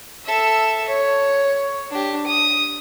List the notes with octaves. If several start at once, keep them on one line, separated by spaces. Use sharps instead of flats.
A4 E5
C#5
D4 G4
D#6